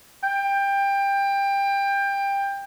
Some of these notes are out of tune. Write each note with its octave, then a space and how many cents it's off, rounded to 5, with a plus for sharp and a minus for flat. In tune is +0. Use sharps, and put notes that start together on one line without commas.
G5 +20